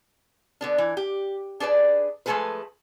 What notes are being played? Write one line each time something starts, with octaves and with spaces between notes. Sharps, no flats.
D3 B3 D4
E3
G4
D4 G#4 B4 D5
F3 G#3 A3 G#4 A4 B4